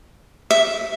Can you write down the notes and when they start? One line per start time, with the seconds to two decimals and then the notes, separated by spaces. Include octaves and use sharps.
0.51 E5